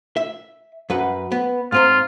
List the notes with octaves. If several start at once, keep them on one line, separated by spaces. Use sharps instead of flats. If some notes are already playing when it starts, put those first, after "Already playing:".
E5
F#2 B4 F#5
B3
G#2 C4 F4 A#5